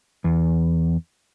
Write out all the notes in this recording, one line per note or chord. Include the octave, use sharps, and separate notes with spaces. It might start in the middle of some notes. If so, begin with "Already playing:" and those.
E2